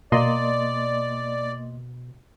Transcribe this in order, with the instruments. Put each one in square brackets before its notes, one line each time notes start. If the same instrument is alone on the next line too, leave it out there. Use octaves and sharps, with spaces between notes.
[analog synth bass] B2 [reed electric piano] A#3 D#5 C6 [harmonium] D5